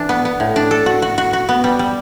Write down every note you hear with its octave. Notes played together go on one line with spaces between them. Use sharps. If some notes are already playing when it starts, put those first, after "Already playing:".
Already playing: E3 D4
B3
B3
A2
D4
A4
F#4
F#4
F#4
F#4
B3
G3
G3